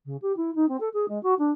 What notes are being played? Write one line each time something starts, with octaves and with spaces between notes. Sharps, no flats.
C#3
G4
E4
D#4
C4
A4
G#4
G#3
F#4
D4